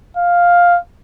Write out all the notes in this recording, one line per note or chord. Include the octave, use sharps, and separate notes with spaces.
F5